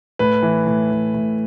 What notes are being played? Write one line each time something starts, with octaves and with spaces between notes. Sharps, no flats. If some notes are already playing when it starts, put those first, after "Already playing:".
A2 B4
E3
A2
E3
A2